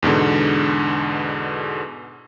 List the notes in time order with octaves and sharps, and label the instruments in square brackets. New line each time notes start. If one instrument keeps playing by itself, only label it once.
[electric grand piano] E2 G#2 B2 D3